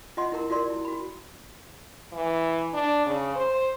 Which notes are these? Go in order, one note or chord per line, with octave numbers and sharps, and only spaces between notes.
F4 D#5 F#5 C6
E4 A#4 A#5
F4 F#4 A#4 D5 C6
E4
F#4 B5
E3
D4
C#3
C5